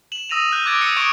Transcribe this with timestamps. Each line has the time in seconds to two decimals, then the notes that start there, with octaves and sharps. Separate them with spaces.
0.12 E7 F#7
0.30 D#6 E6 A#6 D#7 F7
0.52 F#6 G6 D#7
0.66 D6 F#6 G#6 A6 D7
0.81 E6 C#7 D#7
0.96 C#6 D#6 G#6 D7 E7